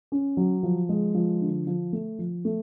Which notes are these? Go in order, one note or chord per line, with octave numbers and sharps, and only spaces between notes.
C#4
F#3
F3
G#3
F3
D3
F3
A3
F3
A3